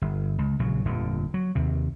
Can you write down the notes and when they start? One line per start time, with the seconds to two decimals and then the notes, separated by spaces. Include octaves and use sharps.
0.02 G1
0.39 C#2
0.59 A#1 C#3 F#3
0.85 G1 F2 A#2 D3
1.34 F#3
1.55 D#2 C3